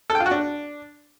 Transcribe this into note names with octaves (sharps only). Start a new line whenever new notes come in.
A4
G5
F4
F#4
D4